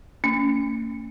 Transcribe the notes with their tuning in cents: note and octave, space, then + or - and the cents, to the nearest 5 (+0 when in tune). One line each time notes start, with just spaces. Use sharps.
A#3 -40 C#4 +20